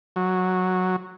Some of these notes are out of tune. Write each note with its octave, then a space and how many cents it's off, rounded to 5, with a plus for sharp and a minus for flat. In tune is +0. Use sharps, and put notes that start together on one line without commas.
F#3 -10